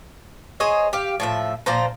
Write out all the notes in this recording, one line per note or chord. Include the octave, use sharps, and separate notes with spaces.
G#4 C5 C#5 D#5
G4 F5
A2 F3 E5
A#2 F3 C5 A#5